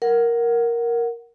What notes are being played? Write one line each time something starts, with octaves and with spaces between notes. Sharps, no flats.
A#4 F#5